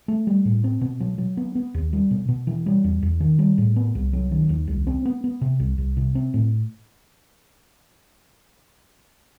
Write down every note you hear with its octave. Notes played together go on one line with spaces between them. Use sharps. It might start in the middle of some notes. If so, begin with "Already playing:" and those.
A3
G3
A2
C4
B2
F#3
F#3
B3
B3
D#2
G3
B2
B2
E3
G3
E2
E2
D#3
G3
A2
B3
C2
F#3
D#3
D#2
C2
C4
B3
B3
C3
C2
C2
C3
C4
A2